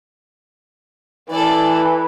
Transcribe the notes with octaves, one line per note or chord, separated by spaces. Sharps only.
E3 A4 B4 D5